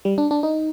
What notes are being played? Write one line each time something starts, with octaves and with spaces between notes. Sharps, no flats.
G3
D4
D4
D#4